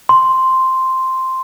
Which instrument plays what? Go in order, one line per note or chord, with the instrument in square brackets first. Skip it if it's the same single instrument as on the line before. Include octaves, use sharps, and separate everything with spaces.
[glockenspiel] C6